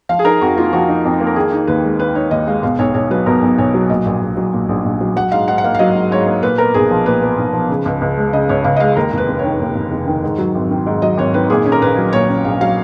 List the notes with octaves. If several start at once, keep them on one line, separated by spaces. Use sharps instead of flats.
F3 F5
G#4
D#4 A#4
F2 F#4
A#3 F4
F3 F#4
D#4
F2
A#3
A#4
D#3 G#4
D#4
D#2 B4
G#3
D#3 B4
D#4 C#5
D#2 D#5
G#3 F5
B2 F5
B1 C#5
B1 C#5
F#3 B4
B2 A#4
B1
B1 C#5
F#3
A#2 D#5
A#1
A#1
F#3
A#2
A#1
A#1
F#3
F#3 F#5
G#2 F5
G#2 F#5
F#5
A#3 F5
F5
F#3 D#5
G#2
G#2 C#5
A#3
A#2 B4
B3 A#4
B1 G#4
F3
A#2 B4
B3
B1
F3
C#3
C#2
C#2
G#3
C#3 D#5
C#2 C#5
C#2 F5
D#5
G#3 F5
D#2 A#4
F1
B4
F1
C#5
D#3
D#2
F1
F1
D#3
G#2
F#3
G#1
D#3
G#2
F#3 D#5
G#1 C#5
D#3 B4
A#2 G#4
C#4
A#4
A#1 B4
F#3
A#2 C#5
C#4
A#1 F5
F#3 F5